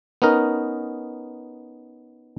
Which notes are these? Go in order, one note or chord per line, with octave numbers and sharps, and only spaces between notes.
B3 C#4 D#4 A#4